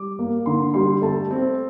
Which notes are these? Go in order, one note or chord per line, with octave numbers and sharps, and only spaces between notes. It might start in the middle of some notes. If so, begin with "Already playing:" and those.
Already playing: G3 D6
A#3
D3 C6
G3 C6
A3 A5
C4